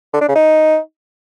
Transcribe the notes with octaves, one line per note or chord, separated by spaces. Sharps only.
D3
D4
C#3
D#4